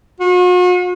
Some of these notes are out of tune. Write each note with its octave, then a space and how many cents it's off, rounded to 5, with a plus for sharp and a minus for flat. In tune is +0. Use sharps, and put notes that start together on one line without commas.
F#4 -45